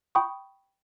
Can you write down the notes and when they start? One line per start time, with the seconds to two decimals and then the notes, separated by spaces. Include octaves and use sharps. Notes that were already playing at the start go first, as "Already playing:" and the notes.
0.15 G5 B5 C#6 D#6